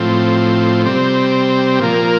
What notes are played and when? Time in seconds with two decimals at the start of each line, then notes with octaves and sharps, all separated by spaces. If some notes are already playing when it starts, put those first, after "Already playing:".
Already playing: A2 F3 C4
0.85 C3 G3 C4
1.80 A#2 F3 A#3